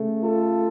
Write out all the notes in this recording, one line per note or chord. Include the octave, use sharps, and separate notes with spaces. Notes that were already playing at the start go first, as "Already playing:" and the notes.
Already playing: C#3 A3
F4 A4